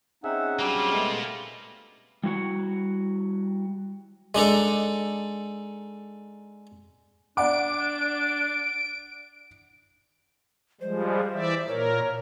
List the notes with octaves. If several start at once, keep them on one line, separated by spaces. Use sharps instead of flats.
C4 C#4 D#4 G#4 E5 F#5
F#3 G3 A#3 C4 D4 F4
G#3 A3 B3
G3 E4 F#4 F#5
G#3 D4 D#4 A4
D4 D5 F#5 D6 D7
F3 G3 G#3 C5
E3 D5 E5
A#2 A#4 C#5